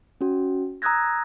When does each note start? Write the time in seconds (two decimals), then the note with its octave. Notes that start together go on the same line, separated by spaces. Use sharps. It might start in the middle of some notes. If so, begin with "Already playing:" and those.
0.21 C#4 F#4
0.82 A#5 D#6 E6 F#6 G#6 A#6